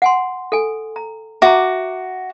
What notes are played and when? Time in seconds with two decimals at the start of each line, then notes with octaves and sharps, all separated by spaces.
0.02 F#5 G#5 C6
0.52 A4 G#5
0.96 A#5
1.42 F#4 E5 A#5 D6